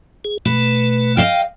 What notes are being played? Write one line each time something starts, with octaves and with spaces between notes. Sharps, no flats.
G#4
B2 A3 B4
D#5 F5 G5